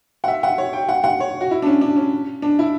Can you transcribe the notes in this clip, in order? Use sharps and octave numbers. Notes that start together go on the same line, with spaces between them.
F#5
E5
F#5
C#5
G5
F#5
F#5
C#5
F#4
E4
D4
C#4
D4
C#4
D4
E4